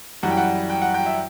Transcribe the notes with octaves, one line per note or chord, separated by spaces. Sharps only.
F#2 E3 G3 F#5
G5
F#5
G5
F#5
G5
E5